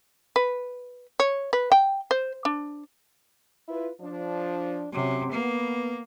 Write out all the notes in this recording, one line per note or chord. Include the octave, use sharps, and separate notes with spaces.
B4
C#5
B4
G5
C5
D4
E4 F4 B4
F3 D4
C3 F#3 C#4
A#3 B3